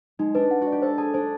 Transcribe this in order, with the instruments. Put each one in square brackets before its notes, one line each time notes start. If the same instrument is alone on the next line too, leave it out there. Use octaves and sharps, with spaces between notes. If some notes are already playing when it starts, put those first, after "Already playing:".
[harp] G#3 [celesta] D#4
[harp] D4 [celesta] B4
[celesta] F#5
[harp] F#4
[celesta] D5
[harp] G4
[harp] A4 [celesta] C5
[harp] G#4 [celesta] A5
[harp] D4 [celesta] C5